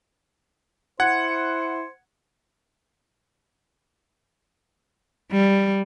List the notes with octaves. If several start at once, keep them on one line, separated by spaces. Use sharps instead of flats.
E4 C5 F#5 G#6 C#7
G3